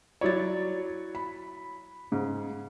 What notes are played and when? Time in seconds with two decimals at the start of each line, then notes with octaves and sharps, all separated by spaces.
0.21 F#3 E4 C#5 D5 A6
1.15 B5
2.12 G#2 C#3